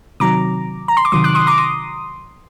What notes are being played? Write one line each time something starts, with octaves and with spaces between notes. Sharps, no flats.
C3 D#3 F#3 A#5 D6
A#5
C6
D6
C3 D#3 F#3 C6 D#6
D6 F#6
C6 D#6
A#5 D6
C6 D#6